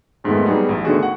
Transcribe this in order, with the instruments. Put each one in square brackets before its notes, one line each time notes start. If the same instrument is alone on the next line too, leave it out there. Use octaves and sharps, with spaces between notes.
[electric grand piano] F2 G#2 D#3 G#3 A3 B3
F#3 G3 B3 D#4 G#4
A1
D3 D#3 A3 B3 F#4 G#4
F#5 C#6